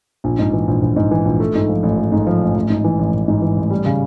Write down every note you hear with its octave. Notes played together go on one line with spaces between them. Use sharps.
A#1
G#2
E3
A#1
A#1
G#2
E3
A#1
A3
G#2
F3
A1
A3
G#2
F3
A1
A1
G#2
E3
A1
A1
G#2
E3
A1
G3
C#3